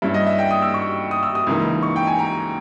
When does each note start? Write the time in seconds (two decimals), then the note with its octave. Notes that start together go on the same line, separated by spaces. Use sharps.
0.02 G2 G3 C#4 E4 E5
0.14 D#5
0.26 E5
0.39 G5
0.51 D#6
0.62 E6
0.74 C#6
1.11 D#6
1.23 E6
1.35 D#6
1.47 C#2 C#3 E3 A#3 D#4
1.83 C#6
1.96 G5
2.07 G#5
2.19 A#5